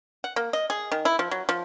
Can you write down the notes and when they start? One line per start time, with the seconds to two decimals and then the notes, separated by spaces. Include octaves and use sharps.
0.24 F#5
0.36 A#3
0.53 D#5
0.70 G#4
0.92 D#3
1.05 E4
1.19 F3
1.31 F#3
1.49 F3